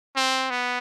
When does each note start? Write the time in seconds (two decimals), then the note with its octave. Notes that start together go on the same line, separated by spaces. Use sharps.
0.17 C4
0.50 B3